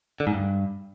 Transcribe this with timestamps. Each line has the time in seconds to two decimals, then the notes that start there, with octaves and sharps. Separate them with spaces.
0.20 D3
0.27 G#2
0.34 G2